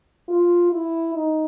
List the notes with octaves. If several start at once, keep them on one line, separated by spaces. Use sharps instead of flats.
F4
E4
D#4